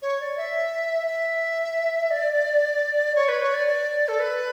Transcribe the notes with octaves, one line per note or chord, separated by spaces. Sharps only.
C#5
D5
E5
E5
D5
C#5
B4
C#5
D5
D5
A4
B4